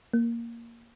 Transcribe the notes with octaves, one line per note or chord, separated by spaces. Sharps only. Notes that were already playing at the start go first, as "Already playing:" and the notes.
A#3